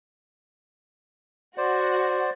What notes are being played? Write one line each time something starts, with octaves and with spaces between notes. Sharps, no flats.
F#4 C5 D5